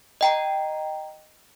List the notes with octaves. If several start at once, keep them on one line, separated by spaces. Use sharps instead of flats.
D#5 G5 A#5